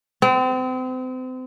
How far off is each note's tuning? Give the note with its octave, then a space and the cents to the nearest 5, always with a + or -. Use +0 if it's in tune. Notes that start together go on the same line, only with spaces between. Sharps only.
C4 -35